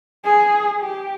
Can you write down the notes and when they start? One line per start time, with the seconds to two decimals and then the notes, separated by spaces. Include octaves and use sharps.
0.25 G#4
0.81 G4